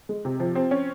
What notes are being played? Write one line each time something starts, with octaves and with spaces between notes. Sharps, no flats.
G#3
C3
F3
C4
C#4